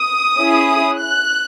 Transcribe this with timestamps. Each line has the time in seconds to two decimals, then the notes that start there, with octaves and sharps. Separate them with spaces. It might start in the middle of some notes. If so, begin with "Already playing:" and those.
Already playing: D#6
0.37 C#4 E4 G#4
0.99 F#6